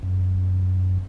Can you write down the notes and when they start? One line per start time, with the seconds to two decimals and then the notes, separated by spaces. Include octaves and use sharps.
0.03 F#2